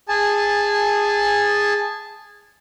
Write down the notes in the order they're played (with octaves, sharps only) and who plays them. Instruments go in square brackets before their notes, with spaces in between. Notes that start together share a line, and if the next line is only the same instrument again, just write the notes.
[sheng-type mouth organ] G#4 G#5 A5